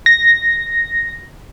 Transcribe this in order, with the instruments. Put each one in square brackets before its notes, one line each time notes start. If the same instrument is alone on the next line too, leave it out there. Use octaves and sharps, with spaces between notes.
[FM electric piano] A#6